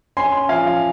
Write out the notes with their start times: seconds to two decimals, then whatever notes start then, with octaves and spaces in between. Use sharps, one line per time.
0.17 C#4 G#5 C6
0.49 F3 F5 G#5